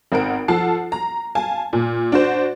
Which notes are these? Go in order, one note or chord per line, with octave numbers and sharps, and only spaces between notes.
G#1 C4 A#4 F#5 D7
F3 A4 F#5 A5 C7
A#5
F5 G#5 A5
A#2
D4 F#4 C5